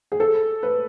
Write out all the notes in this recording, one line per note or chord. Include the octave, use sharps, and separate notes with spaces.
G#4
A4
B4